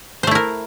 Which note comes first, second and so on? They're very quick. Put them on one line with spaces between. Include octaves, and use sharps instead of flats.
C5 A3 E4 A#4